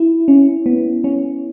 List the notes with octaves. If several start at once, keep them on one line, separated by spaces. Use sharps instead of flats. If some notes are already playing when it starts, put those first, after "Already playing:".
Already playing: E4
C#4
B3
C#4